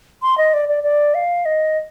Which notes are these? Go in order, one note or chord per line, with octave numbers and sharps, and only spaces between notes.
C6
D#5
D5
D5
D5
F5
D#5